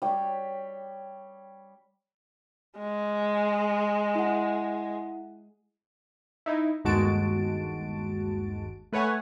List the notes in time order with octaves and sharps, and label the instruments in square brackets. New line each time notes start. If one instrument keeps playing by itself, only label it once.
[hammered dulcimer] G3 C#5 G5
[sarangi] G#3
[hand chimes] E4 F#5
[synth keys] D#4 E4
G1 D#2 G#3 F#4 A5 D7
A3 B4 C#5 F#5 G#5